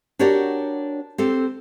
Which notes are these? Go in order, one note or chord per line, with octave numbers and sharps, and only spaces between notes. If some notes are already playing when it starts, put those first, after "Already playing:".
D4 F#4 G4 A#4 C#5 D5
C4 G4 A4